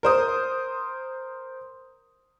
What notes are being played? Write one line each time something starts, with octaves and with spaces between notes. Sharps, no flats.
A#4 C5 D#6